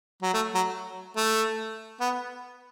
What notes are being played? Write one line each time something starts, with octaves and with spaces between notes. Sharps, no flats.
F#3
A3
F#3
A3
B3